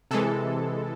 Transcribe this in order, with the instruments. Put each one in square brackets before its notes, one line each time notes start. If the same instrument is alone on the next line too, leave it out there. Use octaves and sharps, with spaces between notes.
[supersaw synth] C3 E3 G#3 A4